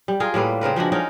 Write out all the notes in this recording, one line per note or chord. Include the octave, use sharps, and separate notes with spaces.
G3
F4 G#4 A#4
A2 G3 A#3 B4
C#3 C4 A#4 B4
F3 G#3 D4 F#4
C#4 D#4 F#4 A#4